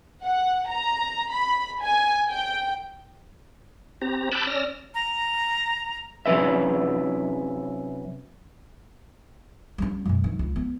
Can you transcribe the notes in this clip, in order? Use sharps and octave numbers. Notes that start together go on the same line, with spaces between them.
F#5
A#5
B5
G#5
G5
C4 G4 A#5
A5 B5 D6 E6 F#6 G6
C#4 D5 E6 F6 A#6
A#5
C3 F#3 A#3 C#4 B4 E5
G3 C#4
F#2 B2
D#3
C#2
B3